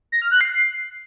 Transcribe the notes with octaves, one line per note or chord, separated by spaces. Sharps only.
A#6
F6
F#6
C7